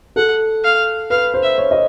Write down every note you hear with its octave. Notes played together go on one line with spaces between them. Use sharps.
A4 F#5
F5
B4 F5
C5
E5
C#5
D#5